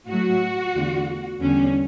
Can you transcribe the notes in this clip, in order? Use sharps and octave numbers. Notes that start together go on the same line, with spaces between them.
A2 F#3 A3 F#4
E2 D3 A3
E2 D3 G3 C#4